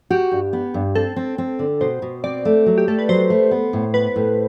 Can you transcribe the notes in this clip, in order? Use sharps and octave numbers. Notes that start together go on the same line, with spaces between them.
F#4 G4
G2
B3
G2
C4 A4
C4
C4
D3
B2 C5
B2
C4 D5
A3
F#3
G4
A3 A4
B4
F#3 C5
A3
B3
A2
B3 B4
A2